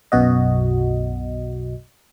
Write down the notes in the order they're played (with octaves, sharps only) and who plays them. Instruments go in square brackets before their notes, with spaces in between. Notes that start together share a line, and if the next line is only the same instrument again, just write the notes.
[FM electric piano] B1 F#2 B2 F#4 D#5